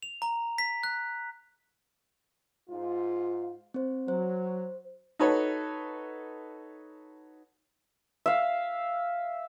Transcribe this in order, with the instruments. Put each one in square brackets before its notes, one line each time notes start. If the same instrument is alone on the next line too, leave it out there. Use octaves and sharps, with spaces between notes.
[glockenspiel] F7
A#5
B6
F#6
[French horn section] G#2 F4
[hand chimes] C4 C5
[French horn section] F#3 [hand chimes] C5
[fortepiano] D#4 F#4 A4 B4 C#5
[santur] E5 F5